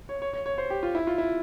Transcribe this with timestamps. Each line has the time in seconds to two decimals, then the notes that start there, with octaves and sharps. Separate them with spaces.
0.09 C#5
0.22 C#5
0.33 C#5
0.46 C#5
0.58 C5
0.70 G4
0.83 F4
0.95 E4
1.07 F4
1.18 E4